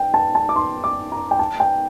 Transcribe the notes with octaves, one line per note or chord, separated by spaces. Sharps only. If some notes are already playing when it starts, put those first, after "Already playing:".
Already playing: G5
A5
A5
D6
C6
D6
A#5
G5
A5
G5